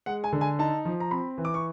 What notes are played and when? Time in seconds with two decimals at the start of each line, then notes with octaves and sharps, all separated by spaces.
0.06 G#3 F#5
0.24 G#5
0.33 D3
0.41 G#5
0.59 D#4 A5
0.85 F3
1.00 A#5
1.11 C4 B5
1.38 E3
1.45 D6
1.54 C#6